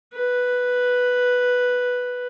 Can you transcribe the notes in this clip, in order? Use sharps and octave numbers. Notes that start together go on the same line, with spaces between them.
B4